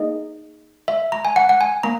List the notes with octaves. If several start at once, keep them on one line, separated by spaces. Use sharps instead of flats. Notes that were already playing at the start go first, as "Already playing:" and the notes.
Already playing: A#3 D#4 G#4 D#5
E5
A#5
G#5
F#5
F#5
G#5
A#3 A#5